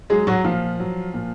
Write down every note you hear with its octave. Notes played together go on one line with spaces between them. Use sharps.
F#3 G#3 G#4
F#3 F#4
A#2 F3 F4
F#3
A#2